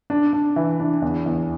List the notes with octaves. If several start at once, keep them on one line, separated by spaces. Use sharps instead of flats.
D4
D4
E3
D4
E2
E2